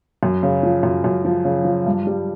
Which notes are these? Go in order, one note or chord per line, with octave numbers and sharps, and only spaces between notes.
F#2
C#3
F3
F#2
F#2
F3
C#3
F3
G2
G3